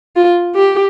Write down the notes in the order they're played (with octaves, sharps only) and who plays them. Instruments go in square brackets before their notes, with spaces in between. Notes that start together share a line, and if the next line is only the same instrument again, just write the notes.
[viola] F4
G4